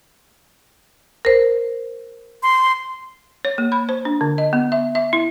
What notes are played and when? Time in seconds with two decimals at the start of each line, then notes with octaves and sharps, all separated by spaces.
1.25 A#4 C5
2.43 C6
3.45 C#5
3.58 A#3
3.72 B5
3.89 C5
4.05 D4
4.21 D3
4.38 D#5
4.53 B3
4.72 E5
4.95 E5
5.13 E4